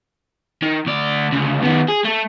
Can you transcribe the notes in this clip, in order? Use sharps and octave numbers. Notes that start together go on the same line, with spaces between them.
D#3
D2 D5
D2 C#3
D#3 B3
G#4
A3